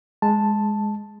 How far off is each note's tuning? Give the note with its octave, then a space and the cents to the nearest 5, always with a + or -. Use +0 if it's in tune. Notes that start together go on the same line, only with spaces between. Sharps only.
G#3 +0 A5 +0